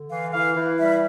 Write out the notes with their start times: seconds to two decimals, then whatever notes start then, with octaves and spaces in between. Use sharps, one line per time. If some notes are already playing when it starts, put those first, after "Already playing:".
Already playing: D3
0.10 E3 F5
0.33 E3 F5
0.56 E3
0.79 G3 E5